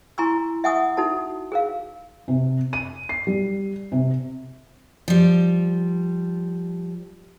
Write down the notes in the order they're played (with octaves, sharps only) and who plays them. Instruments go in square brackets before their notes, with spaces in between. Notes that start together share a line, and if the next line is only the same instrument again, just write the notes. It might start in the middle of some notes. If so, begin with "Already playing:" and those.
[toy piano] E4 G#5 A#5 C6 C#6 E6
E5 F#5 G#5 C#6 D#6 E6
D#4 F#4 A4 A5
G#4 A#4 F5
[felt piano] C3
D#7
C7
G3
C3
[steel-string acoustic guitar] F3 G3